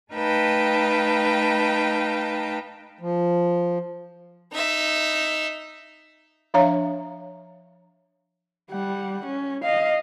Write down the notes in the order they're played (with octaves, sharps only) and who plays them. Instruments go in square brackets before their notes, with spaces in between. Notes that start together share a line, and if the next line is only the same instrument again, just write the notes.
[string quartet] A3 D#4 B4 F5 G5 A5
[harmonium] F3
[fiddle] D#4 E5
[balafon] F3 D4 C#5 E5 F5 A#5
[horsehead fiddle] G3 F#5
C#4
D#5 F5